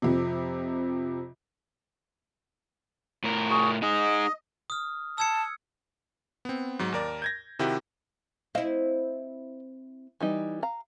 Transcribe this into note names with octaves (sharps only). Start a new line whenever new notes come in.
F2 C3
A2 A#4
F#4 G#4
D#4 G#4 D#5
D#6 F6
A5 E6 G#6 C#7
B3 C4
G#2 F#3
D#2 A#4 D5
G6 G#6 A#6
C3 D#3 E4 F#4 G4
C4 E4 D#5 F5
E3 G3 D#4
F5 A#5